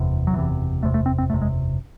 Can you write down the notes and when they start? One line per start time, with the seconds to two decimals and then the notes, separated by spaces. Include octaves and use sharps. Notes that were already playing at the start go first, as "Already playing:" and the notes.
Already playing: F#1 E2 C3
0.27 F#3
0.34 F#1 E2 C3 E3
0.82 F#1 E2 C3 A3
0.94 A3
1.06 C4
1.18 C4
1.30 F#1 E2 C3 A3
1.42 G#3